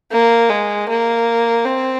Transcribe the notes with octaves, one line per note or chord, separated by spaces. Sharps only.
A#3
G#3
A#3
C4